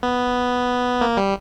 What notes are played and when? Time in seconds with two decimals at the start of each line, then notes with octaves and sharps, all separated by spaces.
0.03 B3
1.01 A#3
1.17 G3